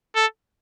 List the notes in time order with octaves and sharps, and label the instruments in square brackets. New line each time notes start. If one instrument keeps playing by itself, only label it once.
[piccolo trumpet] A4